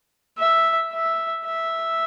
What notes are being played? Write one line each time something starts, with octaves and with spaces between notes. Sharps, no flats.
E5
E5
E5